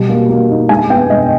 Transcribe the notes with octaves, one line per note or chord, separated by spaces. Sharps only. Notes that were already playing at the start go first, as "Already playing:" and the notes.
Already playing: B2 G3
A#3
A#3
D#4
G#3 G#5
B3 G5
G#3 D#5